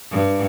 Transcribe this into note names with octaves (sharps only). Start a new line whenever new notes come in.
G2